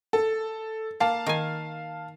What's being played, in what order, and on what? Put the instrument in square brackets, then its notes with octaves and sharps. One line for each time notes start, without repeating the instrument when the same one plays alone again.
[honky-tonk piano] A4
[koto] A#3 [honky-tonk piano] F5 A5
[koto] D#3 G#5